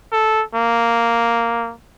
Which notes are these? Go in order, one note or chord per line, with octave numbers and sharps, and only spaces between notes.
A4
A#3